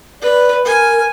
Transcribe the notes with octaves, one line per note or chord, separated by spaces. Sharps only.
B4 D5
A#4 G#5